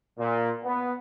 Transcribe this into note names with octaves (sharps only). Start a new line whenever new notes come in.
A#2
B3